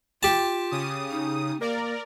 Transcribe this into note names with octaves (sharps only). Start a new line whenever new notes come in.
F4 G4 A5
C#3 D#6
D#4
A#3 A#4 D5